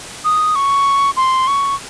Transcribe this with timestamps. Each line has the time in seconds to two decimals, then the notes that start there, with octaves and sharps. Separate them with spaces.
0.24 D#6
0.55 C#6
1.17 C6
1.47 C#6